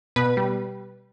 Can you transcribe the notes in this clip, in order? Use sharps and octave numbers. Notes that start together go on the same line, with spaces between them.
B2 B4
G3